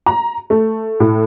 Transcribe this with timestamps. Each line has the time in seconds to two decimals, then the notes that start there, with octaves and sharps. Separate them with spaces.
0.06 A#5
0.50 A3
1.00 A2